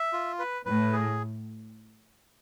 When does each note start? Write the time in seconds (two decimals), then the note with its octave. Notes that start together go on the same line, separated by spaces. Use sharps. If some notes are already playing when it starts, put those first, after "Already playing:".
Already playing: E5
0.13 F4
0.39 B4
0.66 A2 B4
0.93 G#4